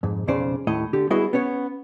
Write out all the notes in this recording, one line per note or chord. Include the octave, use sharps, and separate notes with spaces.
F2 G#2
B1 F2 C#3 C5 D5
D#2 A2 D#5
D3 G4
G3 B3 E4 F#4 G#4 D#5
B3 C#4 C#5 F#5